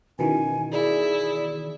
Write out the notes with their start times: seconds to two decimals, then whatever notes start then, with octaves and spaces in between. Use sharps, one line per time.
0.19 B2 D#3 E3 C#4 G#5
0.72 E4 G#4 D5